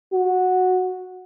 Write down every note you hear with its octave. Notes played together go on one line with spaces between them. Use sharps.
F#4